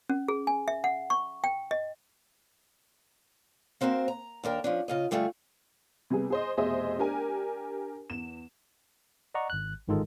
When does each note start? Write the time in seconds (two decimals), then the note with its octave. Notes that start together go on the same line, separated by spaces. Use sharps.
0.09 C#4
0.28 G#4
0.47 G#5
0.68 E5
0.84 F#5
1.10 C#6
1.44 G5
1.71 D#5
3.81 A#3 C4 F#4 A#4 C5
4.08 A#5
4.44 D#2 D4 A#4 G5
4.64 F3 C#4 D4
4.88 C#3 F4 D#5
5.11 D3 G3 A3 F4 G#4
6.10 C3 G3 B3 G#4
6.30 G#4 C5 D#5
6.57 F1 B2 G#4 C5 D#5 E5
6.99 D4 G4 A#4 G#5
8.10 E2 E7
9.34 D5 D#5 F#5 A#5 C#6
9.50 G#1 F#6
9.88 G1 G#2 D#3 G#3 F4 A4